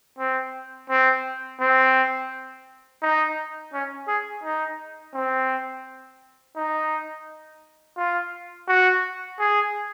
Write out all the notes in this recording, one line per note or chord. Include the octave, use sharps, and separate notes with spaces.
C4
C4
C4
D#4
C#4
G#4
D#4
C4
D#4
F4
F#4
G#4